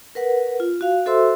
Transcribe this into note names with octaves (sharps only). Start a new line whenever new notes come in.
A#4 B4 F#5
F4
F#4 F5
F#4 A4 C5 E5 C6 E6